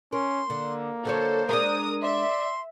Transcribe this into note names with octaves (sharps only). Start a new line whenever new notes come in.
C#4 A#4 C6
D3 A#3
D3 F#3 A4 C5 C#5
G#3 D4 A#4 D#6
D5 E5 C6